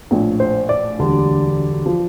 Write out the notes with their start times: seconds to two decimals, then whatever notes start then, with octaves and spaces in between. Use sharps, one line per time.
0.11 A#1 A2 F3
0.40 C5
0.69 D5
0.98 E1 D2 D3 G3
1.86 F3